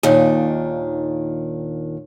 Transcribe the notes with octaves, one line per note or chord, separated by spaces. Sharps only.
D#2 A#2 D#3 D4